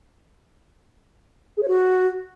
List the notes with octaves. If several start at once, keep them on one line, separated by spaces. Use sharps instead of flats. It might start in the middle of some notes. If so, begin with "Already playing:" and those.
G#4
C#5
F#4